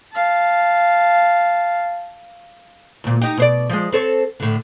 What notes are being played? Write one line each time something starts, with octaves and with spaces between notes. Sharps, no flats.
F5 A5
D2 A#2
D#4 G4
B2 C5 D5
F3 G#3
C4 A4 C#5
A2 D3